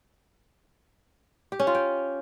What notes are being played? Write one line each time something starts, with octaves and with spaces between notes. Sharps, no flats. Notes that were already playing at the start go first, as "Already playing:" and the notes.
G4
C#4
F4
G5